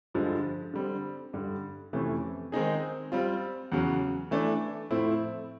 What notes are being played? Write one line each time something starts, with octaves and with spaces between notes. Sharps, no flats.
G2 D3 F3 G#3
D3 G3 C4
G2 D3 G3
F2 C3 E3 A3 C#4
D#3 G#3 C4 D#4 G#4
G3 C4 F4
E2 C#3 F#3
E3 A3 D4
A2 F3 A3 C4 E4